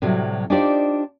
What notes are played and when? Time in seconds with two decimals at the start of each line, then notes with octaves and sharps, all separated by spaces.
0.02 A2 C3 F#3 G3
0.50 D4 D#4 F4 G4 C5 D5